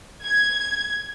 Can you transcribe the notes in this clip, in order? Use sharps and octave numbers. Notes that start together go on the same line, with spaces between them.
G#6